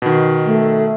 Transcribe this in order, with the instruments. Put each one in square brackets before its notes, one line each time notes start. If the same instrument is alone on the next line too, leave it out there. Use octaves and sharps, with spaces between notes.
[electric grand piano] B2 D#3
[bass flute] A3